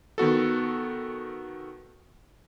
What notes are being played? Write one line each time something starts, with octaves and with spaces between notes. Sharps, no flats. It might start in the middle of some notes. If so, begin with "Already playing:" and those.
D#3 B3 F#4 A4